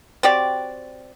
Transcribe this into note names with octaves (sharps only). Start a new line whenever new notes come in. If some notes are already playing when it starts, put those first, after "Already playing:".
C4 F#4 G4 D5